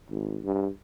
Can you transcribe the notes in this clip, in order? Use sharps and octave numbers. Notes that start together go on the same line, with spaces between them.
G#1
G2